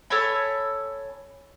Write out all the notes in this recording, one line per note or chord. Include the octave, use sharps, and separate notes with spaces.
A4 C#5 G#5 B5